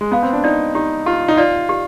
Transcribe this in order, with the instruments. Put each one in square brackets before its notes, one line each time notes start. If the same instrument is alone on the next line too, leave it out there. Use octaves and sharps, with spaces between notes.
[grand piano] G#3
[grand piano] B3 [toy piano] F5
[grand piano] C4
D4
[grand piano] D#4 [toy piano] D5
[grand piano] D#4 [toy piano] G4
[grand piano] F4 [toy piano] G4
[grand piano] D#4
[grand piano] F4 [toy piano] D5
[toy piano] G4